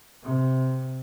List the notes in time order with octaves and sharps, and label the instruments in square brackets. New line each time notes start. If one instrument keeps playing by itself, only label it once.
[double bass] C3